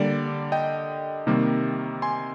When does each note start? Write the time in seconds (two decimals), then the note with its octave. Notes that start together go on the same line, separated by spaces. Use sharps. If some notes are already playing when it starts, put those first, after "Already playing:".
Already playing: D3 G3 A#3 D5
0.52 D#5 G5
1.27 C3 D#3 G3 A#3
2.02 G#5 C6